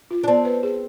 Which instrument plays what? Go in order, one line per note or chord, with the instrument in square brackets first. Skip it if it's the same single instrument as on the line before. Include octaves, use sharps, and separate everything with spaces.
[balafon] F4
[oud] D4
[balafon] B3 [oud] C4
[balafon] B4
G#4